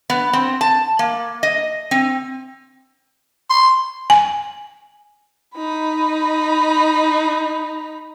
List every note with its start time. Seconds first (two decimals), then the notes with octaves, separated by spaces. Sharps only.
0.10 B3
0.33 C4
0.61 A5
0.99 A#3
1.43 D#5
1.91 C4
3.50 C6
4.10 G#5
5.55 D#4 B5